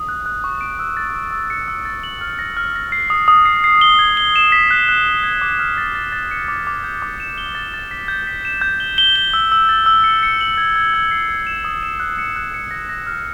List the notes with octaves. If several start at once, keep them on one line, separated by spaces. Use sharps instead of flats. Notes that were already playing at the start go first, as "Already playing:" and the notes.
Already playing: D#6
F#6
F#6
C#6
D7
E6
A6
E6
E6
C#7
E6
A6
F#7
F6
A#6
F6
A#6
C7
D#6
D#6
C7
C7
G7
G#6
G7
E7
B6
F#6
F#6
B6
G#6
D6
F6
A6
A6
A6
C#7
D6
D6
G6
D6
E7
G7
A6
A6
B6
G6
B6
E7
G6
G7
G7
G7
E6
E6
A6
E6
C#7
C#7
F#7
G#6
G#6
G#6
C7
G#6
E7
D#6
E7
F#6
C#7
F#6
C#7
A#6
A#6
F6